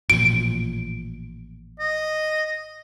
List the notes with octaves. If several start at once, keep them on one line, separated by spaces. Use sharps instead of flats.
A1 A#2 F3 D7
D#5